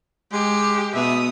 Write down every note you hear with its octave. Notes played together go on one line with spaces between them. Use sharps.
G#3 G4
B2 B3 E5 D#6